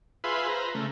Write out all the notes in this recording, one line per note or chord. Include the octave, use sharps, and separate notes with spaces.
F4 G#4 B4 E5 B5 C6
B4 C5 A#5
C#3 A3